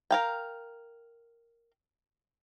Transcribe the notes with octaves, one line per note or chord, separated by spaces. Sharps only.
A#4 F5 G5